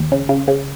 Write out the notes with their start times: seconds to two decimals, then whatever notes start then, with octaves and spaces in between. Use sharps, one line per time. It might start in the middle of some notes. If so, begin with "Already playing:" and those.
Already playing: D#2
0.12 C#3
0.29 C#3
0.48 C#3